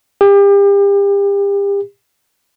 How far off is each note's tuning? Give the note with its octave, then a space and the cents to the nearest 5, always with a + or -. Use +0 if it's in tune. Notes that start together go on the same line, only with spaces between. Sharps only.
G4 +35